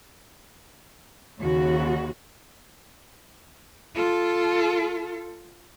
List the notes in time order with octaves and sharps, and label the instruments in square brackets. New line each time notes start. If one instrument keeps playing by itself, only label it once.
[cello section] D#2 C#3 F#4
[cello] F4 A4